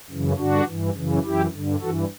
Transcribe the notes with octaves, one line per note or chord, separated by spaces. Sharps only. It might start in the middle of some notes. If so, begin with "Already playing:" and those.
F#2 C#3 E3
G2 D3 D4 F#4
G2 E3
F#2 C#3 E3
F#2 E3 E4 G4
G2 D3
G2 E3 F#4 A4